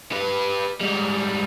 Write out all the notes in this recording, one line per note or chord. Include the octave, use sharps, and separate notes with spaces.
G3 B4
G#2 G3